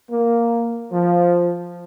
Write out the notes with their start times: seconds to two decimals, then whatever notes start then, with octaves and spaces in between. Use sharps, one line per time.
0.11 A#3
0.92 F3